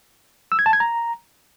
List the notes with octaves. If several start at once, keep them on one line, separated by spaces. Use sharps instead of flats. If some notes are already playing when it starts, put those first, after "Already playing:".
E6
G#6
A5
G#6
A#5